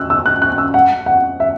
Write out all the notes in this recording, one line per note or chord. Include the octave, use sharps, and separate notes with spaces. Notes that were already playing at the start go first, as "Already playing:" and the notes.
Already playing: E6 F#6
E6
F#6
F#6
E6
F#5
F#5
E5